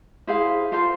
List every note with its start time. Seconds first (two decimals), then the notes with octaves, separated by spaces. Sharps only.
0.27 E4 G#4 C5 F5
0.72 F4 A4 C5 F5